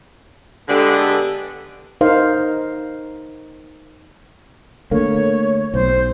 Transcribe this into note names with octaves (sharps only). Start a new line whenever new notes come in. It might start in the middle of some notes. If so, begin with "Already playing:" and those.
D3 G#3 B3 D4 G4 A4
D#4 A#4 C5 F5
D3 A3 A#3 C#5
B1 C5